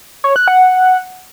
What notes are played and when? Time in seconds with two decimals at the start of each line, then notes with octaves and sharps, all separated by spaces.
0.24 C#5
0.36 F#6
0.48 F#5